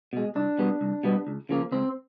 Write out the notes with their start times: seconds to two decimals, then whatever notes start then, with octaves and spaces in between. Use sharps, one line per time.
0.13 B2 G#3
0.35 C2 D4
0.58 B2 G3 B3
0.81 C2
1.04 B2 G3 B3
1.27 C#2
1.49 C#3 F3 A#3
1.72 C#2 C4